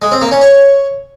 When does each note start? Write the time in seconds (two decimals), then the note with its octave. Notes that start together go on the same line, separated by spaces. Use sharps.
0.02 G#3
0.12 C4
0.21 A#3
0.31 C#4
0.41 C#5